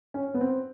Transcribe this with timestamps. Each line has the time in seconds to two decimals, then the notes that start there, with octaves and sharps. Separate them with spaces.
0.14 C#4
0.34 B3
0.41 C4